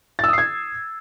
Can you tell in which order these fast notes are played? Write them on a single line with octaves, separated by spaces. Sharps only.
A6 E6 D#6 C7 G#6